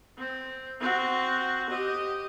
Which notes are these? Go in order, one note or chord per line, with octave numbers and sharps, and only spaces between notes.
C4
C4 F#4
G4 D#5